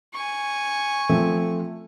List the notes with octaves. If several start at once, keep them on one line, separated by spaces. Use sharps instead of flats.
G#5 C#6
F3 A3 C4